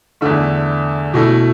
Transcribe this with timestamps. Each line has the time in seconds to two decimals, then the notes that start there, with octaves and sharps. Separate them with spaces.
0.21 E2 D3 A3
1.14 B2 A3 E4